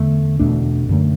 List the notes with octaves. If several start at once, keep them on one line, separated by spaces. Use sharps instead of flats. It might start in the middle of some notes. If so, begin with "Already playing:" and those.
Already playing: E2 D3 A3
E2 B2 A3 D4
F#2 D3 A3